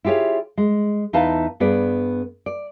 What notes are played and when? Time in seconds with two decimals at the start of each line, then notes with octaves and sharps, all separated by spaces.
0.05 E4 F4 G4 G#4 C#5
0.58 G#3
1.13 E2 D#4 E4 B4 F5 A5
1.60 G2 B3 G#4 B4 D5
2.46 D5